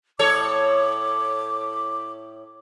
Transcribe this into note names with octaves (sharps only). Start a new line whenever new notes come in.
A2 A4 C#5 D6